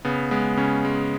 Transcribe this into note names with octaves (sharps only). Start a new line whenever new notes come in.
C#3 B3
G#3 B3
C#3 C#4
G#3